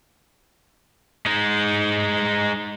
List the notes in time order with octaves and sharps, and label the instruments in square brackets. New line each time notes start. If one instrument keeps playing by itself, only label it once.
[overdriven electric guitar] G#3 D#4